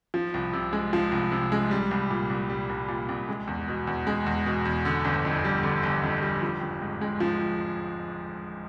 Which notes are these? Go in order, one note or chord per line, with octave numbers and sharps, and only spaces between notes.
F3
C2
C3
G#3
F3
C2
C3
G#3
G3
C2
A#2
C2
G3
C2
A#2
C2
G#3
E2
B2
E2
G#3
E2
B2
E2
D3
G1
F2
G3
D3
G1
F2
G3
F3
G#1
G#2
G#3
F3